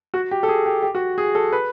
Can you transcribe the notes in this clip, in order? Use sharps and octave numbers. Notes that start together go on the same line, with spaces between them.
F#4
G4
A4
G#4
G4
G4
F#4
G#4
A4
B4